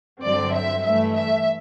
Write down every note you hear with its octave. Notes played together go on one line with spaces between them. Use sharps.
G2 D3 F#3 C4 D5
E5
G2 E3 A3 E5
E5